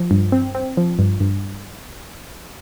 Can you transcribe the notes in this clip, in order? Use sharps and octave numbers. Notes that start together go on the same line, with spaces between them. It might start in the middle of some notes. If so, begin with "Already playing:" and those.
Already playing: F3
G2
C4
C4
F3
G2
G2